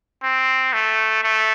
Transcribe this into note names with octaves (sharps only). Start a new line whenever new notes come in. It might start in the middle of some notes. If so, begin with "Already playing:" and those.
C4
A3
A3